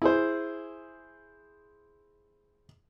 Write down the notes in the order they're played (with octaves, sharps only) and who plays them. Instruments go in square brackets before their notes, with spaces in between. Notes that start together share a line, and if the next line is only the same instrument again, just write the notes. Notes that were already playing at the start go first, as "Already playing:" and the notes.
[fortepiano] E4 G#4 C5